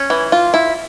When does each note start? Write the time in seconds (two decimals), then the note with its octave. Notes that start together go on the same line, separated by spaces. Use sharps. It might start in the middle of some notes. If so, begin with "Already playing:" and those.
Already playing: C#4
0.10 E3
0.32 F4
0.54 E4